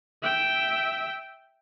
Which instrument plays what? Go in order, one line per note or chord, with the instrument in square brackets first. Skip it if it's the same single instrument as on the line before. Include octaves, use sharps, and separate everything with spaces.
[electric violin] E5 G5